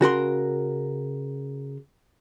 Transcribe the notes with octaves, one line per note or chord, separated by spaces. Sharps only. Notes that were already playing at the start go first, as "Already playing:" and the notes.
C#3 F#4 A#4 C6